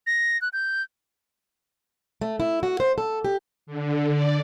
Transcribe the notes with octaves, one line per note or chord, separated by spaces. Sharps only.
A#6
F#6
G6
A3
E4
F#4
C5
A4
G4
D3
D5